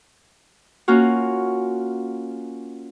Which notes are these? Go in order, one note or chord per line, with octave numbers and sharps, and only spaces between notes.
A#3 C#4 F4 F#4